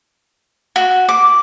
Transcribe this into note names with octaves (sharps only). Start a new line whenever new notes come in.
F#4
D6